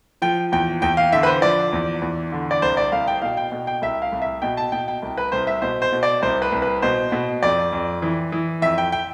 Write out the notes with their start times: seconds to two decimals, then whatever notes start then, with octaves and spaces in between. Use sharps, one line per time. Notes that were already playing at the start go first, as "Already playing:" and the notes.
0.22 F3 G5
0.52 E2 G5
0.82 E2 G5
0.97 F5
1.12 D3 E5
1.23 B4
1.27 C5
1.42 F3 D5
1.73 E2
2.02 E2
2.32 D3
2.51 D5
2.62 C2 C5
2.77 D5
2.92 C2 F5
3.07 G5
3.22 B2 F5
3.37 G5
3.52 B2
3.67 G5
3.82 C2 E5
4.02 F5
4.12 C2
4.22 E5
4.42 B2 G5
4.57 A5
4.72 B2 G5
4.88 G5
5.02 C2
5.17 B4
5.32 C2 C5
5.47 E5
5.62 B2 C5
5.82 C5
5.92 B2
6.03 D5
6.22 C2 C5
6.42 B4
6.52 C2
6.62 B4
6.82 B2 C5
7.12 B2
7.43 F2 D5
7.73 F2
8.02 E3
8.32 E3
8.62 F2 E5
8.78 G5
8.92 G5